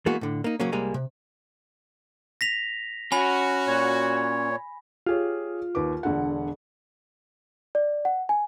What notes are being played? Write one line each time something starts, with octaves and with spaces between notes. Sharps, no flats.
E3 G#3 A#3 B3 F#4
A2 D3
A#3 D#4
C#3 F#3 A#3 C#4
C2 G3 G#3 A#3 G#5 A#5
C3
A#6 B6 F7
C#4 F#4 G#5 B5
A#2 C#5
F4 G4 G#4 C#5
D#2 B4 D6
E1 D3 F#5
D5
F#5
G#5